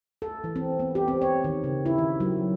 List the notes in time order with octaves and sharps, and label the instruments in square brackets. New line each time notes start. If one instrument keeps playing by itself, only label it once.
[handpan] A4
E3
C4
B3
G4
C4
C#5
D#3
C#3
E4
D#3
F#3